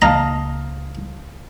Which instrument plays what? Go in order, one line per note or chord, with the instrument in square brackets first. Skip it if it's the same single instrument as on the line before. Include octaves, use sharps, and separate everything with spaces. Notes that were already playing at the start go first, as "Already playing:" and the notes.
[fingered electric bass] C#2 A#3 [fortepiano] D#5 F5 A5 [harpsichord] A#5